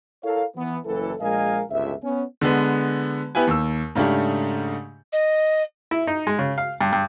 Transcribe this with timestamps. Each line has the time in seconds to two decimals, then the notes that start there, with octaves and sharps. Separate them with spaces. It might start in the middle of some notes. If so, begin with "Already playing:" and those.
0.24 E4 A4 A#4 C#5 F5
0.56 E3 B3
0.85 F#1 E3 A4
1.21 A#1 G#3 A#4 D#5 F5 G#5
1.71 G1 C#2 E5
2.03 B3 C#4
2.41 D3 G#3 B3
3.35 B3 E4 G4 B4 G#5
3.47 D#2 E6
3.95 G#2 C#3 A3 D4 G4
5.12 D#5
5.91 E4
6.07 D#4
6.27 G#3
6.39 C#3
6.58 F5
6.81 G2
6.92 G2